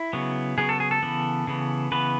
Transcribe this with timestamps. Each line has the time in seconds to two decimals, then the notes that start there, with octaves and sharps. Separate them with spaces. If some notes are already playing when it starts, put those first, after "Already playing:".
Already playing: E4
0.13 C#3 F#3 B3
0.58 C#3 F#3 B3 G#4
0.69 A4
0.80 G#4
0.91 A4
1.02 C#3 E3 B3
1.47 C#3 E3 B3
1.92 C#3 E3 B3 B4